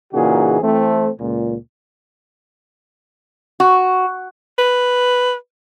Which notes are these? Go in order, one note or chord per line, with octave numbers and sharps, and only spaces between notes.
A#2 C#3 E3 D#4 F#4 G#4
E3 A3 C4
C#2 A#2
F#4
B4